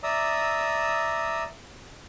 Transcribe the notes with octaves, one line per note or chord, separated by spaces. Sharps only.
D5 E5 A#5 D#6 E6